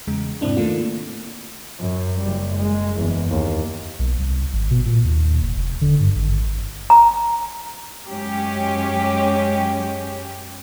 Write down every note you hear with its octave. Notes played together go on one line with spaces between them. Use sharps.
E2 C#3 G#3
G#2 C3 C4 D4 E4
D#3 A3 A#3 F4
F#2
F#1 G3
G#3
F#1 E2
D#2
B1
C2
G#1
B2
A#2
D#2
F1
F1
D3
G2
G#1
A#5
F#2 G#3 C#4 G4